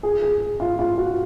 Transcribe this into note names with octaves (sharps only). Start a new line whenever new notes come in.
G#4
G#4
F4
F4
F#4